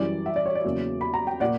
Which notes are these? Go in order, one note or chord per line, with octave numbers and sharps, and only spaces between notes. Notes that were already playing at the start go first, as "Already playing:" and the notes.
Already playing: F#2 E3 G3 D5
E5
D5
C#5
D5
E2 C#3 F#3 A#3
B5
A#5
G5
A#2 A#3 D5 F#5